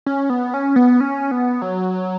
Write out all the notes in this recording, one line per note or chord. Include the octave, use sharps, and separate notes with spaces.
C#4
B3
C#4
B3
C#4
B3
F#3